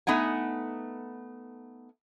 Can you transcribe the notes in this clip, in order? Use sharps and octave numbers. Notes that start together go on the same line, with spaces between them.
A3 B3 D#4 F#5 G#5